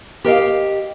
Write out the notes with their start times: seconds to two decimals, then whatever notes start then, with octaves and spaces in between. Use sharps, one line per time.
0.24 G4 A#4 D#5 F5